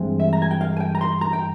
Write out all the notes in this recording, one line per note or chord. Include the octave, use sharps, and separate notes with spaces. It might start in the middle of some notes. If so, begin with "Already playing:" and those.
Already playing: G2 E3 G#3 C4
E5
A#5
G#5
G5
F5
G#5
G5
A#5
C6
A#5
G5